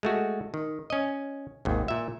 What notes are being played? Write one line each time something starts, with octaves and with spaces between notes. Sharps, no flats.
G#3 A3 F#4
D#3
C#4 D#5
G#1 D#2
A#2 E5